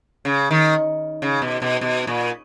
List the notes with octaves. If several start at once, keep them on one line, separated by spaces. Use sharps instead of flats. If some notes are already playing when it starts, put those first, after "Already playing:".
C#3
D#3
C#3
B2
B2
B2
A#2